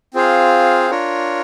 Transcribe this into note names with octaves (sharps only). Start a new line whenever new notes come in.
C4 F4 G#4 C5 F5
D4 F4 A#4 C#5